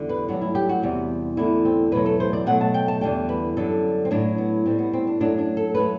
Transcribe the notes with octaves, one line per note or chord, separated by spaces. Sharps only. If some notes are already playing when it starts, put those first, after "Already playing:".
Already playing: E2 D3 G3
B4
G2 F#3 A3 F#4
E4
G4
F#4
E2 C3 G3
E2 D3 A3 E4
C4
E2 B2 F#3 A3 B4
A4
C5
D5
B2 F#3 A3 F#5
A5
G5
A5
E2 D3 G3 G5
B4
F#2 D3 G3 A4
C4
A2 F#3 A3 D4
B3
A2 G3 C4
B3
C4
D4
F#2 F#3 A3 D4
D4
A4
F#3 A3 B4